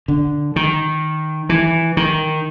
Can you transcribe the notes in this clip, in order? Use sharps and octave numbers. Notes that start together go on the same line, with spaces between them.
D3
D#3
E3
D#3